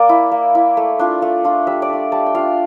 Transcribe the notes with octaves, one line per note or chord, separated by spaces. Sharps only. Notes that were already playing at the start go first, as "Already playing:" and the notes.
Already playing: A#3 D5
E4
A#3
E4
A3
D4 F4
A3
D4 F4
G3 E5
D5
D4 F4
G3 A5
G5
D4 F4 F5